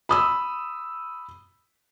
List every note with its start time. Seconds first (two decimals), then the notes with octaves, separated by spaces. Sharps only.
0.09 B5 D#6 E6